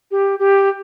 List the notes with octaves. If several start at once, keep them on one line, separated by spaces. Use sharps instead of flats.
G4
G4